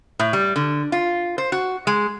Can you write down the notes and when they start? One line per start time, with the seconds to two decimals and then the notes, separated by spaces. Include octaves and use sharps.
0.19 A2
0.33 G3
0.56 D3
0.92 F4
1.38 C5
1.52 F#4
1.87 G#3